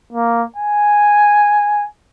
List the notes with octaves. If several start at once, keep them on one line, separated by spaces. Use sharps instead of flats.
A#3
G#5